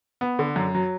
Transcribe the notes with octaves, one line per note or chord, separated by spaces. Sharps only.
B3
D3
F#2
F#3